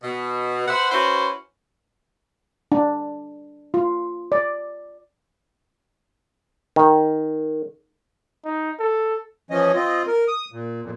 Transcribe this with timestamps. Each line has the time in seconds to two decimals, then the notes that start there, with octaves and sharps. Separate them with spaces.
0.04 B2
0.68 B4 C5 E5 F#5
0.92 C#4 E4 F#4 B4 C5
2.72 D4
3.74 F4
4.32 D5
6.76 D#3
8.45 D#4
8.80 A4
9.51 E3 F3 C#4 D#5
9.75 C4 F4 D#5
10.08 A#4
10.28 D#6
10.52 A#2
10.82 F2 A#2